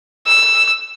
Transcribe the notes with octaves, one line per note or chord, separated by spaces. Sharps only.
E6